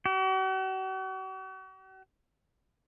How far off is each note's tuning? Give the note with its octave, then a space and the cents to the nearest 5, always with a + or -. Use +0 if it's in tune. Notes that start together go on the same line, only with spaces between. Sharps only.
F#4 +45